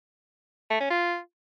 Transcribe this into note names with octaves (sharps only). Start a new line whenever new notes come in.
A3
C#4
F4